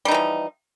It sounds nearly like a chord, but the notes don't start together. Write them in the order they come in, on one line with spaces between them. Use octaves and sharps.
G3 D#4 E3 F3